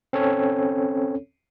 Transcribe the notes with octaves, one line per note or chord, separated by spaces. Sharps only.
C4 C#4 A4 C#5